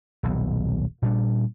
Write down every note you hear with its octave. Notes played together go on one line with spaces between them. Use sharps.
D#1 B1
A#2 G3 D4